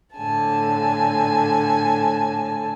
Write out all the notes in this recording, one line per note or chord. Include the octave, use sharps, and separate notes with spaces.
A2 D3 G#5 A5